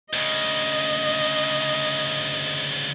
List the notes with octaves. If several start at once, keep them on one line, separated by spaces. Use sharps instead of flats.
D2 C#3 D#5